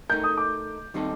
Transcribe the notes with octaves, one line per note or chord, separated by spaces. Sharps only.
A3 D#4 A#4 G6
D#6
D6
D#3 G3 C4 D#4 A4